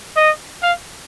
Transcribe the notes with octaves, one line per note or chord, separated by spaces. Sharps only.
D#5
F5